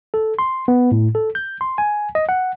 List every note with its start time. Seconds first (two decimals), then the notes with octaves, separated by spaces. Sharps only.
0.14 A4
0.39 C6
0.68 B3
0.92 A2
1.15 A4
1.35 G6
1.61 C6
1.78 G#5
2.15 D#5
2.29 F#5